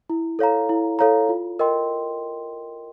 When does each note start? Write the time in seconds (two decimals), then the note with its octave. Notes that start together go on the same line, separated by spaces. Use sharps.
0.10 E4
0.39 A4 C#5 F5 A#5
0.69 E4
0.99 A4 C#5 F5 A#5
1.29 F4
1.59 A#4 D#5 G5 C6